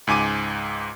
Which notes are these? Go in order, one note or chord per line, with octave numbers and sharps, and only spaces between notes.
C#2 G#2 G#5 D6 D#7